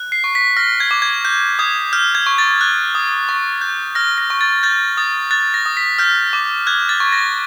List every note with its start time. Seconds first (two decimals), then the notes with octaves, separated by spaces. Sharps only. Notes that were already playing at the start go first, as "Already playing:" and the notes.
Already playing: F#6
0.12 C7
0.24 C#6
0.35 B6
0.57 F6 A#6
0.80 G#6
0.91 D6
1.02 G#6
1.25 G6
1.59 D#6 G#6
1.93 F6 G6
2.15 G#6
2.27 C#6
2.38 A6
2.61 F#6
2.95 D#6
3.29 C#6
3.61 G6
3.95 F6 A#6
4.18 A#6
4.30 C#6
4.41 A6
4.63 G6 A6
4.97 D#6 A6
5.31 F#6 A6
5.54 A#6
5.66 D#6
5.77 B6
5.99 F6 G6
6.33 D6
6.67 F#6 G#6
6.89 A6
7.00 C#6
7.13 A#6